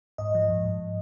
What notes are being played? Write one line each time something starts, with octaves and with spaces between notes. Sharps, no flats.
G#2 D#5
F3
G#2
G#2